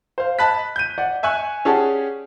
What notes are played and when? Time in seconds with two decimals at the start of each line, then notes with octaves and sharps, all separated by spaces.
0.18 C5 F5
0.39 D#5 A5 B5 F#6 B6
0.76 G6 D#7
0.98 D5 F#5
1.23 E5 G#5 C#6 F#6
1.65 C#4 G4 G#4 D5 F#5 A5